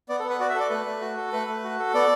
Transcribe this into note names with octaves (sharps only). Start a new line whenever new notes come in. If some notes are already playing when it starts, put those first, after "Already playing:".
B3 D5
A4
B3
B4
F#4 D5
E5
A4 D5
A3 B4
A3
F#4
A4
A3 B4
A3
F#4
A4
B3 D5